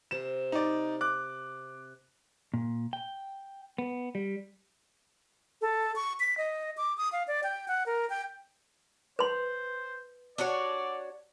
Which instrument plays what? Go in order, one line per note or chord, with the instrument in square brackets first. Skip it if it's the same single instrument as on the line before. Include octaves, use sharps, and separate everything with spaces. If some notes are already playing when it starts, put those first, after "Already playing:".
[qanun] C3 C4 A#4 [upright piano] E7
[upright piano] D#4 D5
D6 F#6
[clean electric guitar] A#2
G5
B3
G3
[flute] A4
C#6
B6
D#5
D6
D#6
F5
D5
G5
F#5
A#4
G5
[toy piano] B4 C6 [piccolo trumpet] C5
[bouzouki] D4 F#4 C#5 [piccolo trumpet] D5